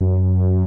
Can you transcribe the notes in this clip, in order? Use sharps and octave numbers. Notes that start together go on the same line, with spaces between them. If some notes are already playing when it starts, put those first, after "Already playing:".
F#2